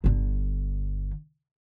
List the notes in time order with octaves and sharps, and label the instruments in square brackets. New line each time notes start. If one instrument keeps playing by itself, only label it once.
[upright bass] G1 D3